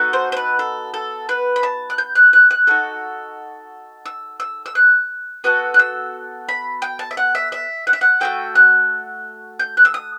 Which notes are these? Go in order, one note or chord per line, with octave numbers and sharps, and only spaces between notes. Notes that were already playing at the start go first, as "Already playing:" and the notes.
Already playing: B3 D#4 F#4 A4
C5
C5
B4
A4
A4
B4
B5
A5
F#6
G6
F#6
F#6
F#6
D#4 F#4 A4
E6
E6
E6
F#6
B3 F#4 A4 F#6
F#6
E6
B5
G5
A5
E5
F#5
E5
E5
F#5
E5
F#5
A3 C4 F#4 A4 G5
F#6
G6
F#6
E6
D#6